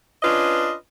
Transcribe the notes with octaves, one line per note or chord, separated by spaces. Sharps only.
C#4 D4 F4 B4 D#5